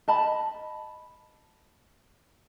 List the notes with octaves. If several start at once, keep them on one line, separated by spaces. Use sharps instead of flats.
D#5 A5 B5